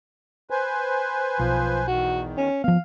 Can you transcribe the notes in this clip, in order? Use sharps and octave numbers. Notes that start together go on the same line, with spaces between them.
B4 C5 G#5
B1 F3
E2 D#3 F#4
C#4
F3 B3 F5